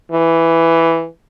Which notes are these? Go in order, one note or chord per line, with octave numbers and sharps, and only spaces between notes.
E3